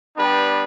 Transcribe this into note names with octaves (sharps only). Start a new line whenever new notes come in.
G3 B3 D4 G4 B4